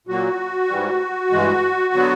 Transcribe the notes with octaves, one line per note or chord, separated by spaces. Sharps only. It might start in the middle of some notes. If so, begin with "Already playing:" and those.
A#2 F#3 A#3 F#4
G#2 E3 G3
G2 E3 G#3
D3 F#3 B3